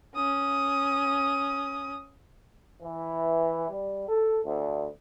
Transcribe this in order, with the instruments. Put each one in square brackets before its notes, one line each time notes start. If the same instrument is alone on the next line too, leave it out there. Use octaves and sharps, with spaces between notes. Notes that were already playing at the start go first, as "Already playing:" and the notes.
[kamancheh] C#4 D#6
[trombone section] E3
G3
A4
D2